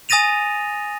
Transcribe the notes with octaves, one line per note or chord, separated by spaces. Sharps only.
G#5 D#6 A6 A#6 D#7 F7